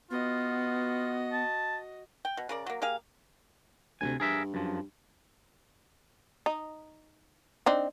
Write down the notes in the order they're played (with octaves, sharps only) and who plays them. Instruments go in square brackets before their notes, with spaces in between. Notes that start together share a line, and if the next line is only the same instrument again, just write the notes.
[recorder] B3 [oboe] F4 [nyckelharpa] F#4 D#5
[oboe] A5
[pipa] G5
B2
C#3 A#4 D5
F#3 A#3
A#3 G4 G#4 F5
[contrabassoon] D2 [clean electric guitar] C3 F#3 G#5
[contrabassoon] G2 [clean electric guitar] G#4 A#4 E5
[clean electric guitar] F#2 F3
[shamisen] D#4
C4 D4 D#4